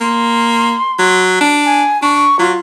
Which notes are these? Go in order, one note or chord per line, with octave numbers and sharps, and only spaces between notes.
A#3 C6
F#3
D4
G#5
D4 C#6
F#3 F4